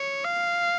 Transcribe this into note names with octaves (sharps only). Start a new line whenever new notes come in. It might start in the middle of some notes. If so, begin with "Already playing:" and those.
Already playing: C#5
F5